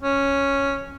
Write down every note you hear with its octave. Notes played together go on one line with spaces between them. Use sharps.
C#4